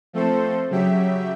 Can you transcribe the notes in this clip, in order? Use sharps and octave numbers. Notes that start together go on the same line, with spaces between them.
F3 A3 C4 A4 C5
C#3 F#3 G4 E5